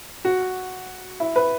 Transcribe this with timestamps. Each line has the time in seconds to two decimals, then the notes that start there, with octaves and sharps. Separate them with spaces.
0.25 F#4
1.20 E4
1.36 B4